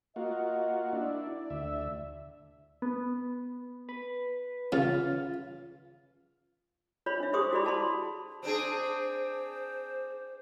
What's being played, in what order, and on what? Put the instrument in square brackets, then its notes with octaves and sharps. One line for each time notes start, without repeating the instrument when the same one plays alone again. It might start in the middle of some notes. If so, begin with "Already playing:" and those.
[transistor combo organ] A#3 F4 F#4 [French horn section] D#5
[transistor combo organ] D4 E4 [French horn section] D5
[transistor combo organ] D2 E5
[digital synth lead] B3
B4
[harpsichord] C#3 [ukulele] F4
[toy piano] F4 C#5 B5
D4 E5
G4 G#4 C5 C6 D6 D#6
E4 F#4 G#4 D5 B5
F#4 A5 B5 C6
[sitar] C4 D4 G#4 [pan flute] C5